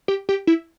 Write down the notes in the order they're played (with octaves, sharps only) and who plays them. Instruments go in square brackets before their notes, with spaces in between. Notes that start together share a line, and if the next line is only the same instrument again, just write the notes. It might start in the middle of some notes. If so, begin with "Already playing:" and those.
[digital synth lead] G4
G4
E4